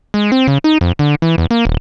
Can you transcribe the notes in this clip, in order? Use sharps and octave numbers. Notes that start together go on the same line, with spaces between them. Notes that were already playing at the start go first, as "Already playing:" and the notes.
G#3
C4
C#3
D#4
F2
D3
E3
E2
A#3
D#1